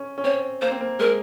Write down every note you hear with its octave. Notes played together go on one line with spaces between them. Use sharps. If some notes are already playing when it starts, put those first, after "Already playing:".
Already playing: C#4
C#4
C4 C#5
A#3 C5
C4
A#3
G#3 A#4